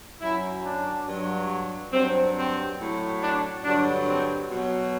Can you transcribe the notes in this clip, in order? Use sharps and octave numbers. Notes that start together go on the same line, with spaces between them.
F#2 F#3 E4
D4
G2 F#3
G2 F#3 C4
C4
A2 F#3
D4
G2 D3 F#3 D4
C4
B2 F#3